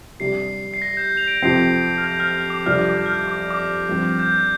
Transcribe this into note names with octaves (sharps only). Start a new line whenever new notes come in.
C3 G3 D4 C7
C7
A#6
G6
F7
D7
F2 C3 F3 C4 C7
D7
F6
G6
F6
F6
D6
F2 C3 G3 D4 F6
D6
G6
F6
D6
D6
G2 F3 C4
G6